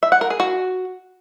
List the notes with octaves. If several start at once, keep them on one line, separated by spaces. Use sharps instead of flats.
E5
F#5
A#4
G#4
F#4